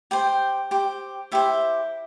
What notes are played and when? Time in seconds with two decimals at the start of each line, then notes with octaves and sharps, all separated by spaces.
0.11 G4 C5 G5
0.71 G4 C5
1.32 E4 G4 C5 E5